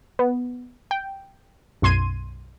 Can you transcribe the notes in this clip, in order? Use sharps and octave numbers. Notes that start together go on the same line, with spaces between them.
B3
G5
B1 F#2 C6 G#6 D#7